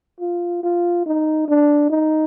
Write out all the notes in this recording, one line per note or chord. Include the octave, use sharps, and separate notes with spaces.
F4
F4
D#4
D4
D#4